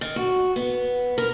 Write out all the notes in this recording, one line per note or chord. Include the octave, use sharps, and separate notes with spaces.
D#3
F#4
B3
A#4